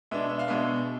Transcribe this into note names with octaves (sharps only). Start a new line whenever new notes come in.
B2 G#3 B3 D4 E5
E5
F5
B2 G#3 B3 D4 E5